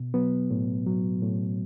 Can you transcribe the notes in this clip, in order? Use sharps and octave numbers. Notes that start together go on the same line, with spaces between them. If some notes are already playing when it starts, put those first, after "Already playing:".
Already playing: B2
F#3 B3
A2
F#3
A2